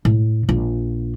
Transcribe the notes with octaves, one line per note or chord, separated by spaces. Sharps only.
A2
A#1 F4